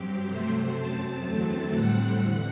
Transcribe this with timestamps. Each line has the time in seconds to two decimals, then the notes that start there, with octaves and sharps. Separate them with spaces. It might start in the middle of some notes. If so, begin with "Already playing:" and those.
Already playing: G2 F#3 C4 G4
0.27 C3 F#3 A3 C4 C5
0.75 F#2 F#3 C4 A5
1.23 E2 D3 F#3 A3 C4
1.72 A2 G3 C4 F#5
2.20 E2 D3